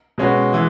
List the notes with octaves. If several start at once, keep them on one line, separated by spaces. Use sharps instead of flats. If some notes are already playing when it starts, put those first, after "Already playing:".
B2 G#3 C#4 F#4 B4
E3 G#3